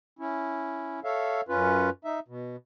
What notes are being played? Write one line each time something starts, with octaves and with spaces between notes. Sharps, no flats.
C#4 E4
A4 C#5 E5 F5
F#2 C#4 F4 B4
D#4 E5
B2